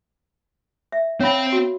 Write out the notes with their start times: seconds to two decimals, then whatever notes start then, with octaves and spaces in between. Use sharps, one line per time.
0.92 E5
1.20 C4 C#5 F5 G5 B5
1.52 F#4